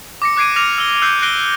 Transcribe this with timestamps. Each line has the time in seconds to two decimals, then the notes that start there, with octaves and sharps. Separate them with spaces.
0.22 D6 A#6 C#7
0.36 D6 F#6 G#6 C7 D7 D#7
0.56 D6 F6 A#6 F7
0.78 E6 G7
1.02 E6 F#6 G6 C7 F7
1.22 F#6 A#6 C7 D7 D#7 G7